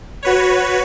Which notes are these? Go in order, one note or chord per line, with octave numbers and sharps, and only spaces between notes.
F#4 B4 C#5